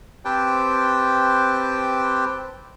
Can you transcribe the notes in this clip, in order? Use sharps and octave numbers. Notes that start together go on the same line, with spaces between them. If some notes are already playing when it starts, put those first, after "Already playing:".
C4 G4 B4 C5 G5 A5